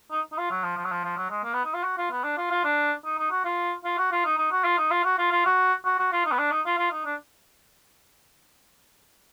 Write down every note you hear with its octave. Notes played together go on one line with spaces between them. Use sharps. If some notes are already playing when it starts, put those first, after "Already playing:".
D#4
D#4
F4
F#3
F3
F3
F#3
F3
F3
F#3
G#3
A#3
B3
D#4
F4
F#4
F4
B3
D4
F4
F4
D4
D#4
D#4
F#4
F4
F4
F#4
F4
D#4
D#4
F#4
F4
D#4
F4
F#4
F4
F4
F#4
F#4
F#4
F4
D#4
B3
D4
D#4
F4
F4
D#4
D4